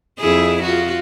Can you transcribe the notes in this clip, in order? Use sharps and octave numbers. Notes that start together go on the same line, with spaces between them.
F2 E4 G#4
F4 F#4